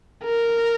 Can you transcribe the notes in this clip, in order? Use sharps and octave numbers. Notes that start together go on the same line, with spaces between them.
A#4